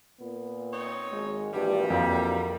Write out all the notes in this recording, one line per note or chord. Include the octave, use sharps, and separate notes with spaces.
A#2 B3
C4 D#4 C#5
G#1 G#3
A#1 G2 E3 G3 F#4
F2 A#3